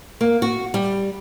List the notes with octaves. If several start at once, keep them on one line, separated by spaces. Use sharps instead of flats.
A#3
F#4
G3